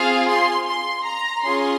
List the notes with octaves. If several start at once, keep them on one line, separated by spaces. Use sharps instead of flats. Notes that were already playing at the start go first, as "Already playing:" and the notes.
Already playing: C4 F4 G#4 F5
C6
C6
A#5
C#4 F4 G#4 C6